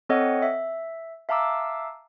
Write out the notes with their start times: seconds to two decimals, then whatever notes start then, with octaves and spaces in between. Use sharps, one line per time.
0.09 C4 A4 C#5 D#5 F#5
0.42 E5
1.29 E5 F5 A5 A#5 D6 E6